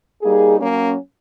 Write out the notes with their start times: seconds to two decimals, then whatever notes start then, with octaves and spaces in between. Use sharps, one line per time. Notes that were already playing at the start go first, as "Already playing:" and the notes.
0.22 G3 A#3 D#4 G#4
0.59 F#3 A#3 C#4